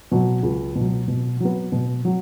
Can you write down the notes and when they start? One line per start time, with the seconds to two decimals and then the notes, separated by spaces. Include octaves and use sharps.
0.11 B2 F#3
0.43 C#2
0.75 B2
0.81 F#3
1.08 B2
1.40 F#3 B3
1.72 B2
2.05 F#3